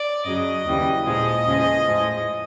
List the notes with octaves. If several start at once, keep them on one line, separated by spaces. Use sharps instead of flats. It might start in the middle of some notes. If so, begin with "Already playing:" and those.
Already playing: D5
F#2 C#3 F#3 D#5
D#2 C#3 E3 G3
A#2 F3 G#3 D#5
E2 C#3 F3 G#3
A2 F3 G#3